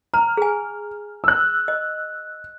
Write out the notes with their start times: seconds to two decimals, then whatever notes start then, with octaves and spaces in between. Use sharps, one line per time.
0.14 A#5 F6
0.37 G#4 G#5
1.24 E6 F#6
1.68 D#5